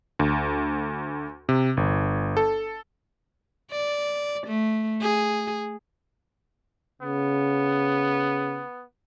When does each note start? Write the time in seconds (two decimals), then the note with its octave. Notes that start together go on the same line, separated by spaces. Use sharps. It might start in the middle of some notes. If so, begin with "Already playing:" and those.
0.19 D2
1.49 C3
1.77 G1
2.37 A4
3.72 D5
4.47 A3
5.02 G#4
7.02 C#3 B3